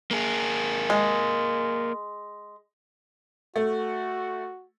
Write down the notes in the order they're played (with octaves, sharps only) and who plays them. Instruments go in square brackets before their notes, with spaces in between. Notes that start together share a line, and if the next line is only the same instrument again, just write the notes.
[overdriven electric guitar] A#3 G#4
[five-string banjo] G#3
[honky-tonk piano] A3 [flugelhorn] F#4